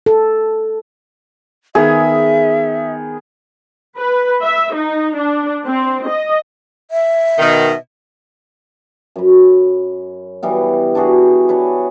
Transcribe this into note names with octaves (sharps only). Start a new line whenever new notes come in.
A4
D#3 B3 G#4 E5
B4
E5
D#4
D4
C4
D#5
E5
B2 D#3
F#2 B5
E3 G3 B3
D4 E4 F#4 G#4
D4 B4 C#5